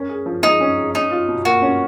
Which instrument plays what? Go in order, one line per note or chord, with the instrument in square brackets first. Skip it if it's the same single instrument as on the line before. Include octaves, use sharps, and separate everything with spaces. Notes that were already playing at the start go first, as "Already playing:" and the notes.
Already playing: [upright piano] C#4 A#4
G#4
F3
[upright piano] G#3 [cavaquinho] D#4
[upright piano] C#4
G#4
[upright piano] C#4 [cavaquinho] D#4
[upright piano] F4
B2
[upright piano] A#3 [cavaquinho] F#4
[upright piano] C#4